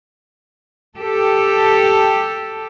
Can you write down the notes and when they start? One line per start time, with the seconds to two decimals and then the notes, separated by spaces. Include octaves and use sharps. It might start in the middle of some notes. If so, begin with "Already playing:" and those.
0.97 G4 A4